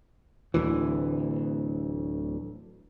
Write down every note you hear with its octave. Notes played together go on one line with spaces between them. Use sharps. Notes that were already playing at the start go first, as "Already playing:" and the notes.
D1 D2 E3